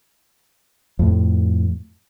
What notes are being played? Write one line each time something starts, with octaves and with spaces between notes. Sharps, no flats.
F2 A2